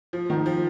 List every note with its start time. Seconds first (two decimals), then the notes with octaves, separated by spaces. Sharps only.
0.13 F3
0.30 D#3
0.46 F3